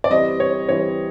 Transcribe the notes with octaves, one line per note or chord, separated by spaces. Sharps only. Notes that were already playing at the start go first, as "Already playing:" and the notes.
D5
E3 G3 C4 D#5
C#5
E3 G3 C4 C#5